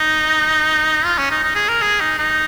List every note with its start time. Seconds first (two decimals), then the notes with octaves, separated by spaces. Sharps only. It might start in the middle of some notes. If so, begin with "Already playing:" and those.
Already playing: D#4
1.05 F4
1.18 C#4
1.31 D#4
1.43 D#4
1.55 G#4
1.69 A#4
1.81 G#4
2.00 D#4
2.19 D#4